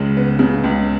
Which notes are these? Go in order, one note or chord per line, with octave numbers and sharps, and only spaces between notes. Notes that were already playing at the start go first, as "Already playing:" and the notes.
Already playing: C#2 C#3 G#3
B3
C#3
C#2